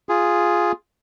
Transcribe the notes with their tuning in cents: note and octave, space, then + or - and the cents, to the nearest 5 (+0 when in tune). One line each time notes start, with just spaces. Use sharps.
F4 +0 G#4 +0